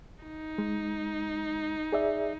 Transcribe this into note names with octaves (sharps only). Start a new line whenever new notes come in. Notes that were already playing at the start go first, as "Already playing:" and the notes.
D#4
G#3
G#4 D5 E5